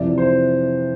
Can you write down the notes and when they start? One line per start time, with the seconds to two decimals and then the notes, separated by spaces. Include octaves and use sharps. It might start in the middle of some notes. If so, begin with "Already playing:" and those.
Already playing: F2 C3 E3 D5
0.18 C5